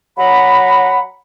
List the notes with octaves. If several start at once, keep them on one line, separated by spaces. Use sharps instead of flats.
F#3 F#5 A#5 B5